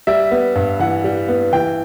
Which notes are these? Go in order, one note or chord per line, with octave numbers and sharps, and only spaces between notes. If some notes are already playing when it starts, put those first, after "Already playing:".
G3 E5
B3
G2
E3 F#5
G3
B3
E3 G5